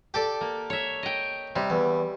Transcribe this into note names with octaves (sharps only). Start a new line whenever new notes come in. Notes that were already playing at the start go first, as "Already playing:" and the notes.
G4 A4 D5
A#3
C#5 E5
D#5 G5
C3 G3
E2